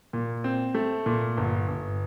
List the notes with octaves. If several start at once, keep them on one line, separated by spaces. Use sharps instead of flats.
A#2
C4
A3
A#2
G1
G1